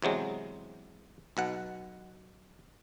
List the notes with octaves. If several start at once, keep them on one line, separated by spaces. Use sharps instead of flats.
E2 C3 F#3 G#3
B1 B2 F#5